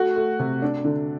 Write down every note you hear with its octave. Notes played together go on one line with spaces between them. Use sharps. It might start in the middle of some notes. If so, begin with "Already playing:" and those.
Already playing: A3 F#4
A3
C3
D4
D3